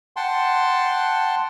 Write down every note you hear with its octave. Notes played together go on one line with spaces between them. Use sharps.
F#5 G5 A5 C6